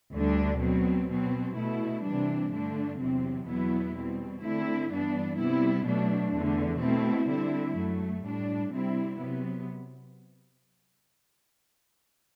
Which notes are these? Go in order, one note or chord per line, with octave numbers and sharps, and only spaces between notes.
D2 D3 G3 D4
B2 F#3 C4
B2 F#3 C4
B2 A3 E4
C3 E3 G3 D4
G2 D3 A3 D4
E2 C3 F#3 C4
E2 B2 F#3 B3 E4
B2 G3 C4
D3 A3 C4 E4
G2 E3 B3 D4
C3 G3 B3 E4
B2 F#3 A3 D4
E2 D3 A3
B2 A3 C4 E4
D3 G3 C4 E4
F#2 F#3 A3
A2 G3 D4
C3 G3 C4 E4
C3 F#3 B3